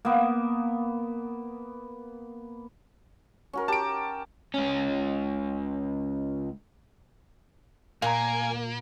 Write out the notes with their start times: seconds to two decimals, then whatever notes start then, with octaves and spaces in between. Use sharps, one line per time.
0.05 A#3 B3
3.53 C#4 F#4 A#4
3.68 G4 A5 D7
4.54 C#2 C#4
8.02 A#2 A#3 F5 G#5 A#5